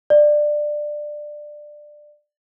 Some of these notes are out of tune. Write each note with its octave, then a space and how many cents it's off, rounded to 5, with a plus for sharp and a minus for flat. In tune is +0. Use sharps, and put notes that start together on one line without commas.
D5 +15